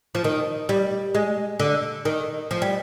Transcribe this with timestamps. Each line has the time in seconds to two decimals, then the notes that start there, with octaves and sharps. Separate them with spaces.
0.15 F3
0.24 D#3
0.69 G3
1.15 G#3
1.60 D3
2.05 D#3
2.51 F3
2.62 G3